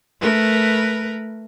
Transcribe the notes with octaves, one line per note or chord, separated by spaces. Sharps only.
A3 A#4 B4